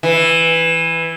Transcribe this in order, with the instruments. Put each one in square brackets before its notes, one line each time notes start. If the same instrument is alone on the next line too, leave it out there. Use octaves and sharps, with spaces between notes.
[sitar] E3